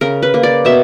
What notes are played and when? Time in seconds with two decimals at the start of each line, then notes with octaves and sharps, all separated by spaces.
0.01 C#3 A#4
0.22 B4
0.34 A#3
0.43 D5
0.65 B2 E5